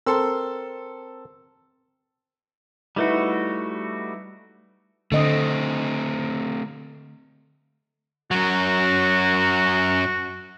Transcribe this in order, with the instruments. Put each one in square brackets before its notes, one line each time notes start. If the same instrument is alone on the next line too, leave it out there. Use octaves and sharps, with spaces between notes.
[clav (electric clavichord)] C4 A#4 [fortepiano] A4 C6 E6
[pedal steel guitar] G3 A3 F#4 [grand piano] D#4 E4 B4
[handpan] D3 D#5 [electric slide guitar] A3 C4
[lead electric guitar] F#2 F#3 [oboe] F#4